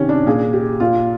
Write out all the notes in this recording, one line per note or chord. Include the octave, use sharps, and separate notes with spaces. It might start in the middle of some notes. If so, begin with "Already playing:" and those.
Already playing: C3 D#3 C#4
D4
A#2 G#4
G4
A#2 F4